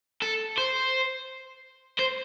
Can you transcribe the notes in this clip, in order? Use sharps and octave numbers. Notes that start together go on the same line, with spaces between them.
A4
C5
C5